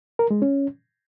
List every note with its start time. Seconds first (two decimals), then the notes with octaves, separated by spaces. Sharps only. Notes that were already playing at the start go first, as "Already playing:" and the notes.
0.19 A#4
0.31 G#3
0.42 C#4